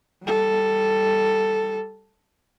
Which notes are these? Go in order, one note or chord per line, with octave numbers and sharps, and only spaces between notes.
G3 A4